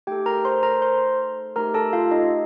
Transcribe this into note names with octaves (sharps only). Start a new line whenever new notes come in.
A3 D#4 G4 A4 G5
A#4 A#5
C5 C6
A#4 A#5
C5 C6
A3 D#4 G4 A#4 A#5
A4 A5
F4 F5
D#4 D#5